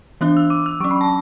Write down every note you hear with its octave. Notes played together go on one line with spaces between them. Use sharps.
E3 B3 D4 F#6
E6
D6
E6
F#3 C#4 C#6
B5
A5